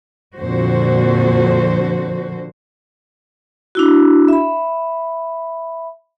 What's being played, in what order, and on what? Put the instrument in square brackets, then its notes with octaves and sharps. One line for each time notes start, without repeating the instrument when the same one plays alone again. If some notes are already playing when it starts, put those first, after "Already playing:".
[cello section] F2 A#2 D3 F#4 C5
[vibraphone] D4 E4 F#4
E5 B5